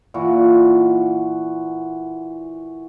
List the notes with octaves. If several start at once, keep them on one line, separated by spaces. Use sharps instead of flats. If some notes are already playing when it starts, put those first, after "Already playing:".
A#2 E3 F#4